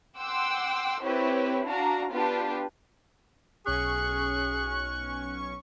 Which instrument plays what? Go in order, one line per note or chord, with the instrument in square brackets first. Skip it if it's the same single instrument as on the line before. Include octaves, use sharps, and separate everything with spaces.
[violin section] F#5 G5 C6 D6 E6
C4 E4 G4 B4 C#5
D4 F#4 F5 A#5
B3 D4 F4 G4 B4
[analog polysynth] B1 C#4 C#6 [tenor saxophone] G#4 [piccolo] F#6